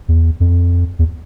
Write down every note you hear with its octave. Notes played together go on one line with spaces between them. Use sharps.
E2
F2
E2